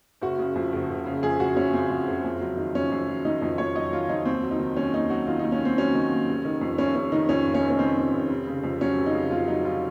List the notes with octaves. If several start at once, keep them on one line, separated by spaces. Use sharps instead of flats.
F#1 F#4
C#3
F2
F#1
F#1
C#3
F2 G#4
F#1 F#4
F#1 C#4
C#3 C4
F2
F#1
F2
F#3
D#3
F2 C#4
F2
F#3
D#3 D#4
F2 D#4
F2 C#5
F#3 D#5
D#3 F4
F2 D#4
D#2 C4
F#3
D#4
D#3
D#2 C#4
D#2 D#4
F#3 F#4
D#3 F4
D#2 D#4
C#4
D#2 C4
F#3 C#4
D#3
D#2
F1
D#3
F2
F1 C#4
F1 C#4
D#3 D#4
F2 C#4
F1
C#4
F1
C#4
D#3 C4
F2
F1
F1
C#3
F2
F#3 C#4
F1
D#4
C#3
F2 F4
F#3 D#4
F1 F4